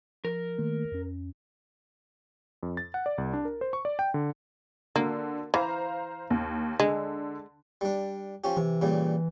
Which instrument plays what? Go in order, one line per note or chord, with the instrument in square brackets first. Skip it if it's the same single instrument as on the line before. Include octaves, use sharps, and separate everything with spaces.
[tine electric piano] F3 [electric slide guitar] A#4
[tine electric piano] D#3 A3 A#3
F2 C#4
[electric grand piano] F2
A6
F#5
D5
C2
D4
A#4
C5
C#6
D5
G5
D3
[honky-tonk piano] D3 F#4 [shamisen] A#3
[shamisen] E3 [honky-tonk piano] C5 F5 A#5
[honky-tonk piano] D#2
[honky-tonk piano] D3 [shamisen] G#3
[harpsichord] G3 D4
F3 C#4 G4
[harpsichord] C3 [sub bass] E3
[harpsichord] A#2 C#3 G3